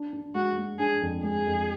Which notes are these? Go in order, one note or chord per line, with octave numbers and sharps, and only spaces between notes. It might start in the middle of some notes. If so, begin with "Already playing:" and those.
Already playing: D4
D4
G#3 F#4
G#3
D4 G#4
F2
G#3 G#4
F2